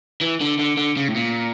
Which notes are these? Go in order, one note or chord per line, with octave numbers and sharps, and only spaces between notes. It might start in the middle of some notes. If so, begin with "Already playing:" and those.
E3
D3
D3
D3
C#3
A2
A#2